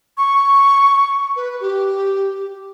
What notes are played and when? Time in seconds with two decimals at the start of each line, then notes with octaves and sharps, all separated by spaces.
0.18 C#6
1.36 B4
1.60 G4